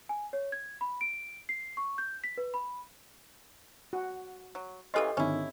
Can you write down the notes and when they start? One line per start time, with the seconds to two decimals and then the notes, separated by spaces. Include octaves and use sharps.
0.09 G#5
0.33 C#5
0.52 G#6
0.81 B5
1.01 D7
1.49 C7
1.77 C#6
1.98 G6
2.24 B6
2.38 B4
2.54 B5
3.93 F#4
4.55 F#3
4.94 C#3 E3 C#4 G4 A4 C5 D#5 C6
5.17 G#1 D3 D#3 C#4 E4